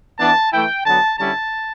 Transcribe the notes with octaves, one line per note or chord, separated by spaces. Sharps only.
E3 B3 D4 A5
E3 A3 E4 G5
D3 F#3 B3 A5
D3 G3 C#4 E4 A5